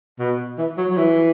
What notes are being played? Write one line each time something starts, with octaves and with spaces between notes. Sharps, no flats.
B2
E3
F#3
F#3
E3